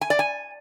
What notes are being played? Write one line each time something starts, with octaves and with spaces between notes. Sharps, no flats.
G#5
D5
G#5